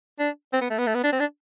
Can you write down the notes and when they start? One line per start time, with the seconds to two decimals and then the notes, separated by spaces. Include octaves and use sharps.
0.19 D4
0.53 C4
0.61 B3
0.70 A3
0.78 B3
0.87 A3
0.94 B3
1.04 D4
1.12 C4
1.20 D4